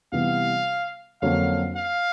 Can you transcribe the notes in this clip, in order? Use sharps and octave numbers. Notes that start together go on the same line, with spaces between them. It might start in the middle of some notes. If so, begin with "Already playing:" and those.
C3 E3 G3 B3 F5
F2 D3 F#3 A#3 C#4 F5
F5